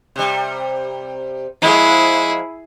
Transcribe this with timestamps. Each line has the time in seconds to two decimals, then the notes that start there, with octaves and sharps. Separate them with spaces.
0.16 C3 G3
1.62 F3 G#3 A#3 E4 G#4